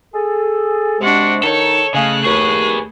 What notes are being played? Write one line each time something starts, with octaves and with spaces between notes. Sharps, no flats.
G#4 A4
C3 G#3 D4 F#4 F#5
D#3 D#4 A4 C#5
C#3 A3 D#5 F5 G#5 F#6
D#2 G#4 B4 C#6